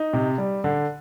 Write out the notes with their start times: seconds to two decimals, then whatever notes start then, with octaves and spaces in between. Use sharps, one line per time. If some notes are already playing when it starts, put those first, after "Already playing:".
Already playing: D#4
0.13 C3
0.38 G3
0.64 D3